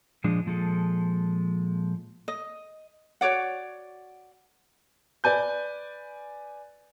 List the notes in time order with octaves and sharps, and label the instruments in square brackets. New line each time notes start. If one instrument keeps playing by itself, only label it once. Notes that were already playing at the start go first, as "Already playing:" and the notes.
[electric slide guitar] A#2 F3 G#3 D4
A#2 F3 G#3 A4
[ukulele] D#5
F#4 C#5 D5 F#5
[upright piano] B4 D5 G#5 G6